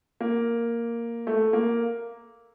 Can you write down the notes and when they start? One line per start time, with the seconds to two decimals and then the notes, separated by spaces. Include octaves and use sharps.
0.21 A#3
1.27 A3
1.53 A#3